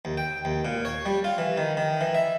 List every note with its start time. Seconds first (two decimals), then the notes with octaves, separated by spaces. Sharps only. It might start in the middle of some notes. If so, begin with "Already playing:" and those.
0.05 D#2
0.18 G5
0.45 D#2
0.65 A#2
0.85 C#5
1.06 G3
1.24 F4
1.38 E3
1.58 D#3
1.77 D#3
2.01 E3
2.15 E5